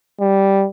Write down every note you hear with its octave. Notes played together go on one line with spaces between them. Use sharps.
G3